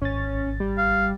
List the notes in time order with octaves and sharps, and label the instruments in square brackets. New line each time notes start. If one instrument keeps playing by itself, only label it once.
[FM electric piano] G#1 A6 [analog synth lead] C#4
[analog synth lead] G3
[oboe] F5